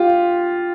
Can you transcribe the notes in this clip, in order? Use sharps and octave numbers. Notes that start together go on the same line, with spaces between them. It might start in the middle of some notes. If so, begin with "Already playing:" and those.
Already playing: F4 G4